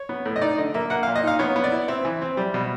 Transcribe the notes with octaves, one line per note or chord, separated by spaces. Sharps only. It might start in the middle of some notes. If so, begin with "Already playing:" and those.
Already playing: C#5
B3
A2
D#5
D#4 D5
D3 D#5
A#3 E5
A#3 F#5
A#2 F5
D#5
D#4 F5
B3 C#5
B3
D5
E4
C4 E5
E3
C4
G3
B2